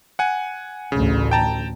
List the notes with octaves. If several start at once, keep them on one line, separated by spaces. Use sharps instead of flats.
F#5 G#5
A1 D2 C#3
G5 A5 A#5